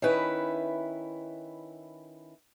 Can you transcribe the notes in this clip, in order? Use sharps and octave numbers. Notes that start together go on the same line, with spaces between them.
D#3 C#4 E4 B4